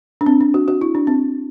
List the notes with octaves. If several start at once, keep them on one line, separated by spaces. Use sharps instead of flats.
D4
C4
D4
F#4
F#4
E4
D4
C4